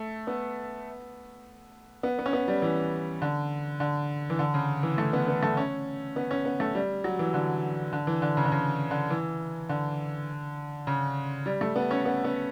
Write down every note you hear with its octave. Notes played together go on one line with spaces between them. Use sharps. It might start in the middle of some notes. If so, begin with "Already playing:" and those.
Already playing: A3
B3
B3
B3
C#4
B3
G3
E3
D3
D3
E3
D3
C#3
E3
A3
B3
B3
A3
C#4
B3
C#4
B3
A3
G3
F#3
E3
D3
D3
E3
D3
C#3
D3
C#3
D3
E3
D3
C#3
G3
A3
B3
C#4
B3
B3